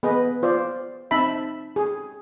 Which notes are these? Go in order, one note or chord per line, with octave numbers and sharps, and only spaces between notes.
B3 G#4 B4 D#5
F4 C5 D5
C4 D#4 E5 A5 B5
G#4